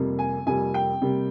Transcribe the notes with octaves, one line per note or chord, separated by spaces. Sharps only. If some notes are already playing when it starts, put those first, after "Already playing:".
Already playing: F2 C3 G3 A#3
G#5
F2 C3 G3 A#3 G#5
G5
C3 G3 A#3